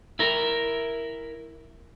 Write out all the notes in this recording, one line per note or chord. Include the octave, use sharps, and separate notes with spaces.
E4 A#4